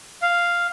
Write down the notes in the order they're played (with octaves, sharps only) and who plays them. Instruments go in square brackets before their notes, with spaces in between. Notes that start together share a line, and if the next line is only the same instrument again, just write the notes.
[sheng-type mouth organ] F5